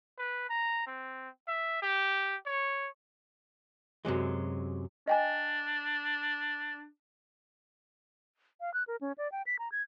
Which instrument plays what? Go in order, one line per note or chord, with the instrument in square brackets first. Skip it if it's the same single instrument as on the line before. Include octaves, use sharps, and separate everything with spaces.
[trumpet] B4
A#5
C4
E5
G4
C#5
[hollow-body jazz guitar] F#2 C3 F#3 G#3
[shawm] D4 [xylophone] D#5 G5 G#5
[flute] F5
F#6
A#4
C#4
D5
G5
B6
A#5
G#6